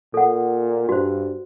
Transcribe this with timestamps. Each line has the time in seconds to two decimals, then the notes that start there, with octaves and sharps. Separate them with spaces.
0.14 A#2 A4 F#5
0.89 G2 F#4 C5